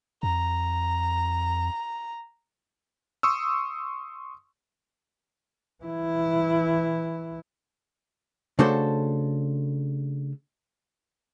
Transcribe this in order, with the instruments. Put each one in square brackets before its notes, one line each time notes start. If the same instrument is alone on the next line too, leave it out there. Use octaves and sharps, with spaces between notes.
[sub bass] F2 [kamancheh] A#5
[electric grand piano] C6 C#6 D#6 E6
[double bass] E3 E4
[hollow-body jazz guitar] C#3 A3 D4 F#4 A4 C5